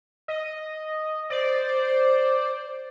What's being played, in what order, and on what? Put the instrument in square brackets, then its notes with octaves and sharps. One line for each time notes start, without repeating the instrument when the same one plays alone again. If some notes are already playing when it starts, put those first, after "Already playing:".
[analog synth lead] D#5
[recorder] C5 [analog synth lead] D5